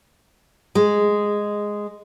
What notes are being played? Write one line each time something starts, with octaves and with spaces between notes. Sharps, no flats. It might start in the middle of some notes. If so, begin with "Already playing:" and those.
G#3